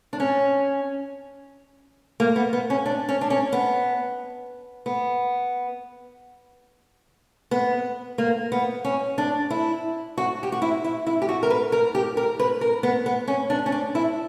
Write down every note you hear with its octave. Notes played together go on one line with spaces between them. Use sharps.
D4
C#4
A#3
B3
B3
C#4
D4
C#4
D4
C#4
B3
B3
B3
A#3
B3
C#4
D4
E4
F#4
G4
F#4
E4
E4
E4
G4
F#4
A#4
B4
A#4
G4
A#4
B4
A#4
B3
B3
C#4
D4
C#4
D4
E4